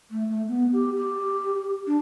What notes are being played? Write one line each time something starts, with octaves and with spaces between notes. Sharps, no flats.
A3
A3
B3
G4
G4
D4